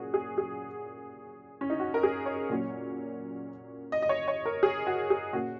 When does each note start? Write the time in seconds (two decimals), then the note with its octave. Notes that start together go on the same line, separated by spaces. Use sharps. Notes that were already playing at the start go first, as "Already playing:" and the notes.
Already playing: A#2 F#3 A#3 C#4 F#4 G#4
0.14 G#4
0.38 G#4
1.61 C#4
1.70 D#4
1.80 F#4
1.94 A#4
2.03 G#4
2.26 C#5
2.50 A#2 F#3 A#3 C#4
3.92 D#5
4.02 D#5
4.09 C#5
4.28 C#5
4.45 A#4
4.63 G#4
4.87 F#4
5.10 G#4
5.33 A#2 A#3 C#4 F#4